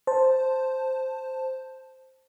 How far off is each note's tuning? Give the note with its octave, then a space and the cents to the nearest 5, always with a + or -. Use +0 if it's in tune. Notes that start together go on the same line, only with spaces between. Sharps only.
C5 +0 A5 +0